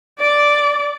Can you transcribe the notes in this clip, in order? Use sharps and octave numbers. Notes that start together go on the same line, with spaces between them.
D5 D6